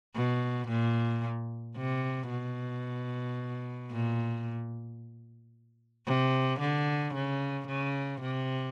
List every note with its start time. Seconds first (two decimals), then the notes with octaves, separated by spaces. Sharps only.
0.15 B2
0.68 A#2
1.77 C3
2.30 B2
3.92 A#2
6.07 C3
6.60 D3
7.14 C#3
7.68 C#3
8.21 C3